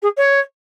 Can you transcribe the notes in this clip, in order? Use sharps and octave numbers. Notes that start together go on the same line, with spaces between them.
G#4
C#5